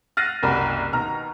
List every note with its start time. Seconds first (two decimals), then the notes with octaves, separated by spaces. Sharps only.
0.17 F6 F#6 A6 A#6 C7 D#7
0.43 F#1 C2 F#4 A#4 D5 B5
0.93 D#2 B2 A#5 F6